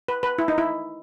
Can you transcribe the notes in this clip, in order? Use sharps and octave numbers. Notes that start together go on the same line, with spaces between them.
B4
B4
E4
D#4
E4